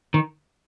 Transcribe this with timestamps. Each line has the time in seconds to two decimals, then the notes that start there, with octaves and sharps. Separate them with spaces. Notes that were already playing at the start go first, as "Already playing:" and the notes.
0.14 D#3